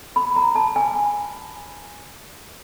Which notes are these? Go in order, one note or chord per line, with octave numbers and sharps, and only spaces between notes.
B5
A#5
A5
G#5